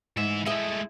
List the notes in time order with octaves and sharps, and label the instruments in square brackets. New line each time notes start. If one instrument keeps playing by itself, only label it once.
[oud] G#2 [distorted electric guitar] E3 E5
[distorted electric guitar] G#3 A3 [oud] E4 D#5